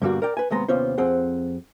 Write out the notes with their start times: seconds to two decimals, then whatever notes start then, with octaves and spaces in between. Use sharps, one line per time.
0.02 G2 B2 D3 G3 A#3 F#4
0.22 A#4 D5 G5
0.37 B4 G#5
0.50 D#2 C3 G#3 B3 A#5 C6
0.68 D#2 C3 B3 C#4 F4 C5
0.98 F2 C4 G#4 F#5